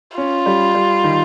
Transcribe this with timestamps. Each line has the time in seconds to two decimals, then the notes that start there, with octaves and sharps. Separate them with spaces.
0.17 C#4 F4
0.46 G3
0.75 G3
1.04 D#3